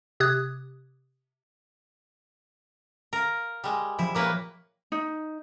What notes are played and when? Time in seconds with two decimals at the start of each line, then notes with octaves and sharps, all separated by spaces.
0.20 C3 G4 D#6 F#6 G#6
3.13 A#4 F5
3.64 G3 G#3
3.99 F3 E4
4.15 A#2 A#3 B4 C#5 B5 D6
4.92 D#4